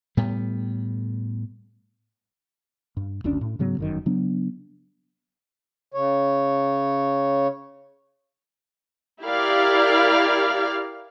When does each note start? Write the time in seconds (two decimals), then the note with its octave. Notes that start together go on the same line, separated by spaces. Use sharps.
0.17 A2 G3 B3
2.97 G2
3.24 F#1 D2 C#4 D4
3.41 A2
3.59 G#2 C#3 F#3 B3
3.79 G1 F#2 D#3
4.06 C#3 F#3 B3 D4
5.94 C#3 C#5
9.22 E4 G4 A#4 D5 F5